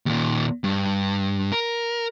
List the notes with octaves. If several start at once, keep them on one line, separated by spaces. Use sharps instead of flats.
D#2 A#2
G2
A#4